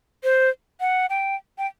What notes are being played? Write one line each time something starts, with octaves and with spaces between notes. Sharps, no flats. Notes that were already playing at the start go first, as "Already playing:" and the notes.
C5
F#5
G5
G5